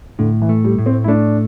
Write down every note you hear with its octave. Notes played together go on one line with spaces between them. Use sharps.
A2 D3
E3
A3
G3
A2
C4
E4
A3 D4